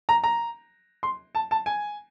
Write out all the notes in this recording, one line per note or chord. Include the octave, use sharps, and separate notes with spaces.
A#5
A#5
C6
A5
A5
G#5